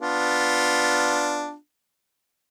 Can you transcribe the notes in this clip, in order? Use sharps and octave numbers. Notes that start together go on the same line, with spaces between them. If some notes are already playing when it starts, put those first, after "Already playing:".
B3 D4 F4